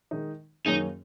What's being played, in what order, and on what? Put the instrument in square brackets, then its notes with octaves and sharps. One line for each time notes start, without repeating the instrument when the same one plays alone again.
[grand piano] D#3 G#3 D#4
[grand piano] F#2 D#3 A#3 C#4 G#4 [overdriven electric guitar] D#4